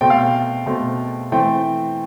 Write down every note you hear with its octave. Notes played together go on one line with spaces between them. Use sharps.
B2 A3 C4 G5
F5
G5
B2 A3 C4
E3 A3 C4 G5